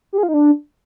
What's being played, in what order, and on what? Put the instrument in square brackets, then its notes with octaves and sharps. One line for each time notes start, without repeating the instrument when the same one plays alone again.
[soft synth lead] G4
G#4
F4
D#4
D4